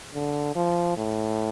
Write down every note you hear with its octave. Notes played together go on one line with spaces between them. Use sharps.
D3
F3
A2